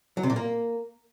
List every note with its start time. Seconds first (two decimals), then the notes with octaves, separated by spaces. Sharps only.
0.17 F#3
0.23 C3
0.30 A#2
0.36 A#3